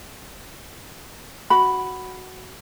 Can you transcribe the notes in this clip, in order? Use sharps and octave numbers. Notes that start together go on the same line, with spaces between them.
F#4 B5